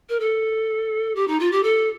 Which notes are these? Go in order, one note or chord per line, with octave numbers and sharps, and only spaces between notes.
A#4
A4
G4
D#4
F4
G4
A4